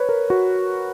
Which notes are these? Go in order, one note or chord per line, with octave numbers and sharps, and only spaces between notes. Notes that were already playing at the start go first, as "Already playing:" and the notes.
Already playing: B4 C#5
A#4
F#4